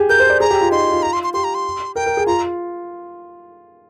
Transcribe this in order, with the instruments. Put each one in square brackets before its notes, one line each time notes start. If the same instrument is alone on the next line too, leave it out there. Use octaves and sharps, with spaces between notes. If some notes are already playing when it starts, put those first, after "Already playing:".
Already playing: [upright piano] G4 G#4
[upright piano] A#4 [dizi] G6
[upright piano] C5
D5
[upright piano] G#4 [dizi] A#5
[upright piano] G4
F4
[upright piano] D#4 [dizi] C6
[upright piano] F4
F4
[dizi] A#5
C6
C6
[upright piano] G4 [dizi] C6
[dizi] A#5
C6
[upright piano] A#4 [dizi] G5
[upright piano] A#4
G#4
[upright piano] F4 [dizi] A#5